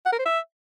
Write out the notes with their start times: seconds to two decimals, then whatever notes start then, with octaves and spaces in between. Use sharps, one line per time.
0.06 F#5
0.12 A#4
0.19 C5
0.26 E5